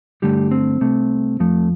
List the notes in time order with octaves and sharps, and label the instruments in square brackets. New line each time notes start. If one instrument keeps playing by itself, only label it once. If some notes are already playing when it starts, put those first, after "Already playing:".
[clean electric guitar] G2 D3 G3 A3 G4
C4
C2 C3 A3
F2 F3 A3